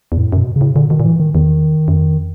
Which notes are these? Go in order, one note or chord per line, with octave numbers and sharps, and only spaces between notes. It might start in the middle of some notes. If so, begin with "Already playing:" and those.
E2
F2 A2
F#2 B2
C#3
A2
A#2 D3
B2 D#3
A#2
A2 E3
D#3
E2 D#3
F#2
F2